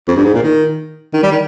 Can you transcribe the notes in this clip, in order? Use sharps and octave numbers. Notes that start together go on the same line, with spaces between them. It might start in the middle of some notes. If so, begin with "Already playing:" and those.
F2
G2
G#2
A#2
D#3
D#3
G3
D#3